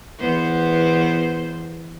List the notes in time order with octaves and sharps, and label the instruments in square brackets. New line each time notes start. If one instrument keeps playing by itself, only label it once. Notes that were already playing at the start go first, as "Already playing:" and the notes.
[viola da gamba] E2 B3 C5